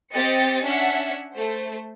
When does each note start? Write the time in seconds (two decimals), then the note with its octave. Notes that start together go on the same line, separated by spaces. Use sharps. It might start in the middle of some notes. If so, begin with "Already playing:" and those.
0.12 C4 G4 D#5 A6 C#7
0.64 C#4 D4 E5 F#5
1.34 A3 C5